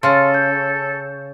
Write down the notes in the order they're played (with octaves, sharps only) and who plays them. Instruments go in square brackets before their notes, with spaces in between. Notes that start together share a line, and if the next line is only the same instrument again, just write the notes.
[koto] C#3 [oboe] A4 [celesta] C6 F6 A6
[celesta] G6